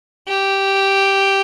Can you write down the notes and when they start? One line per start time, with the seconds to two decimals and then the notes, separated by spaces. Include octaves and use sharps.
0.28 G4